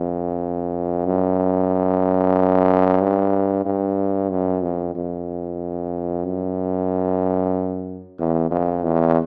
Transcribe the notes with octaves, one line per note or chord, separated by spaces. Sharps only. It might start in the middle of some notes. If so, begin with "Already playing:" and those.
Already playing: F2
F#2
G2
G2
F#2
F2
F2
F#2
E2
F2
E2